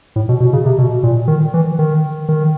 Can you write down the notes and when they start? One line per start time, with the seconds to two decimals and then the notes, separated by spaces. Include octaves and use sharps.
0.16 A2
0.29 B2
0.40 B2
0.53 C#3
0.66 C3
0.78 B2
1.03 A#2
1.28 D#3
1.54 E3
1.79 D#3
2.29 D#3